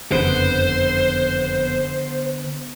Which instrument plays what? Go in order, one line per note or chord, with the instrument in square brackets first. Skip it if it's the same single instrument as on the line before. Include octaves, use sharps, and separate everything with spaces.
[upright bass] F#1 F2 [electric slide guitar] D3 B3 B4 [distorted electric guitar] C5